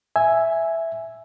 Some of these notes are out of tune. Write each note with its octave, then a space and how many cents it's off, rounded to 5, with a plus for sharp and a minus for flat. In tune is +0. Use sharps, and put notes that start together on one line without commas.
E5 +0 G#5 +0